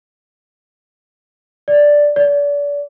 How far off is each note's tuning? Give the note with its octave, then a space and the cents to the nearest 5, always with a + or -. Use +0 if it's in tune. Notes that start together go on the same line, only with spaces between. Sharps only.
D5 +0
D5 -35